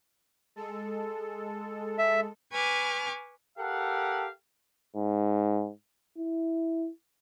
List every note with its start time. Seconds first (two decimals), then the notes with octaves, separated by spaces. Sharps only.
0.56 G#3 A4
1.98 E5
2.52 B4 G#5 C#6 D6 F6
3.58 G4 A4 A#4 F5 F#5
4.96 G#2
6.18 E4